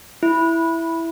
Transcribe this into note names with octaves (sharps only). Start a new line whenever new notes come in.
E4